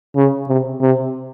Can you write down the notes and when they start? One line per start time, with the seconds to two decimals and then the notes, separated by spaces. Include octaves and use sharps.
0.16 C#3
0.48 C3
0.81 C3